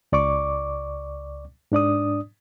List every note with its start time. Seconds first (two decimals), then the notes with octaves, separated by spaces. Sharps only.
0.12 C#2 D5 C#6 D6
1.72 G#2 D4 D5 D#6